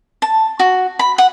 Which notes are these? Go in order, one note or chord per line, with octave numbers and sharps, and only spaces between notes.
A5
F#4
B5
F#5